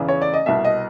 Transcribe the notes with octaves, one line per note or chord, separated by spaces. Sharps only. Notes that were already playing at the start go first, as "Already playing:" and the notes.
Already playing: E2 C#3 E3
C#5
D5
D#5
C2 B2 E5
D#5